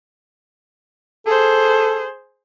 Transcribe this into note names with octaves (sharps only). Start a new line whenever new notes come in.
G#4 A4 C5